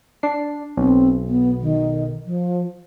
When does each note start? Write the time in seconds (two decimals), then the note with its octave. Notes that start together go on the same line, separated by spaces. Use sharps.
0.23 D4 C7
0.77 B1 C4
1.28 B3
1.61 D#3
2.26 F3